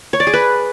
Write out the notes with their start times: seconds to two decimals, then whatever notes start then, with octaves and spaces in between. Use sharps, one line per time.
0.13 C#5
0.20 D5
0.27 G#4
0.33 B4